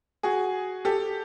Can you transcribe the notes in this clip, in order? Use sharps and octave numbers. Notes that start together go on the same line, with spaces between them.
F#4 G#4
G4 A4